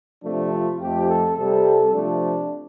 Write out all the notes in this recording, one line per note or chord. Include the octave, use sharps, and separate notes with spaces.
C3 F3 A3 D4
F4
F2 F3 A3 G4
A4
C3 G3 A4
C3 F3 A3 D4